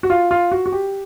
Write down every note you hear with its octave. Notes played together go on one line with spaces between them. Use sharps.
F#4
F4
F4
F#4
F#4
G4